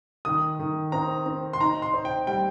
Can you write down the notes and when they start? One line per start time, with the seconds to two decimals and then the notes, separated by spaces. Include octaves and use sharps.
0.25 D#3 D#6
0.59 D#3
0.92 C4 A#5
1.26 C4
1.53 C6
1.60 D#4 A#5
1.82 C6
1.94 C5
2.05 G5
2.27 G3 G5